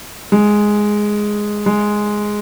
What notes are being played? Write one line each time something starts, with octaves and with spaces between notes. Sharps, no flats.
G#3
G#3